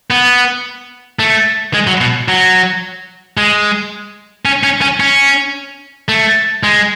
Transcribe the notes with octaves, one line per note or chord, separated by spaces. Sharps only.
B3
A3
G#3
F#3
B2
F#3
G#3
C#4
C#4
C#4
C#4
A3
G#3